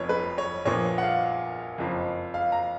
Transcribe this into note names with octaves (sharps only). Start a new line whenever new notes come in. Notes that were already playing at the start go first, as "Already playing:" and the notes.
Already playing: F1 F2 F3 B3 C#5
B4
C#5
A#1 A#2 F3 B3 C#5
F#5
F5
F#1 F2 F3
F5
A#5